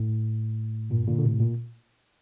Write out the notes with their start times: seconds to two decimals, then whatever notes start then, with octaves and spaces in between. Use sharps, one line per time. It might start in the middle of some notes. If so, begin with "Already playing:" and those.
Already playing: A2
0.90 G2 A#2
1.07 A#2 D3
1.18 D3
1.24 A2 C3
1.40 A#2